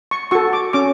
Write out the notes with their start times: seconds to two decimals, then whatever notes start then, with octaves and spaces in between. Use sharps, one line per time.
0.11 C#6
0.31 F#4 A4 C#6
0.53 D6
0.73 C#4 D6